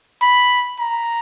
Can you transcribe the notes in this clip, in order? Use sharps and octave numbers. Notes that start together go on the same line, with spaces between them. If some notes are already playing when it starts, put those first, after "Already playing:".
B5
A#5